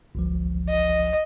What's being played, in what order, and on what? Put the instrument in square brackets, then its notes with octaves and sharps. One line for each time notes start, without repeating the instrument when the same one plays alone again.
[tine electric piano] G1 C#2 F3
[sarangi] D#5